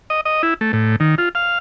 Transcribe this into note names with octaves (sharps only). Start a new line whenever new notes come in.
D#5
D#5
E4
A3
A2
D#3
F4
F5